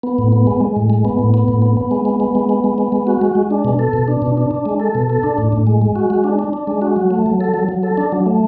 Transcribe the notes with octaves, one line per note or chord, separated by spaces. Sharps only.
B3
A2
B3
G#3
G#3
A2
G#3
B3
A2
B3
A2
B3
B3
G#3
B3
B3
G#3
B3
G#3
B3
G#3
F#4
G#3
G#3
D4
B2
A4
B2
D4
B2
D4
D4
G#3
A4
B2
A4
D4
A2
A2
G#3
G#3
F#4
G#3
D4
D4
D4
G#3
F#4
F#3
A3
F#3
A4
F#3
F#3
A4
D4
F#3
A3